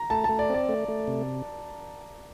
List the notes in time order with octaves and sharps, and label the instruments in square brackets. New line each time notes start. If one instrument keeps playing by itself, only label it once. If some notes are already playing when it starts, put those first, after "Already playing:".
Already playing: [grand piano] A#5
[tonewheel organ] A3 [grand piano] A5
[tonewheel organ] A3 [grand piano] A5
[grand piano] D5
[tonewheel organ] C4 [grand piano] D5
[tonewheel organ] A3
A3
C3